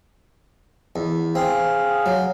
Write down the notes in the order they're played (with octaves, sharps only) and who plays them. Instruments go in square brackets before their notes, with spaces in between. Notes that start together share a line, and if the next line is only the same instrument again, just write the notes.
[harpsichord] E2
[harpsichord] C4 [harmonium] G#4 F5
[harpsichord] F#3